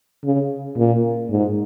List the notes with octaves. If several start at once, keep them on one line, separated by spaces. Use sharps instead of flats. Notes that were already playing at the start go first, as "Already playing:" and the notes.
C#3
A#2
G#2